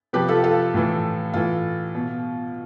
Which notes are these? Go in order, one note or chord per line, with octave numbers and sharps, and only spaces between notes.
C3 F3 G4 B4
F4 A4
F4 A4
A2 E3
A2 E3 F4
B2